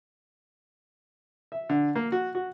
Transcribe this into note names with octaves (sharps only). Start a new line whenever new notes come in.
E5
D3
A#3
F#4
F#4